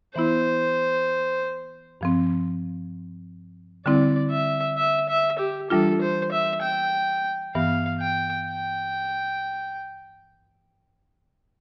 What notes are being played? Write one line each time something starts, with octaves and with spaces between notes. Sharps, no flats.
E3 B3 E4 C5
G2 F3 C4
D3 G3 C4 E4 D5
E5
E5
E5
G4
E3 G3 D4 F4 A4
C5
E5
G5
G2 E3 B3 F5
G5
G5